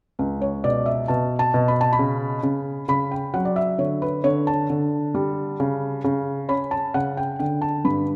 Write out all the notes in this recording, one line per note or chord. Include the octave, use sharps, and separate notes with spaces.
C#2
C#5
B2 D5
E5
B2 A5
A5
B2
B5
A5
B5
C#3
C#3
C#3 B5
G5
F#3 F#5
D5
E5
D3 C#5
B4
D3 C#5
A5
D3
G3
C#3
C#3
C#4 B5
A5
C#3 F#5
G5
D3 G5
A5
G2 B5